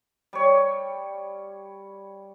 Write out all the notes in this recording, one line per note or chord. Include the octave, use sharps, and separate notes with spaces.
G3 C#5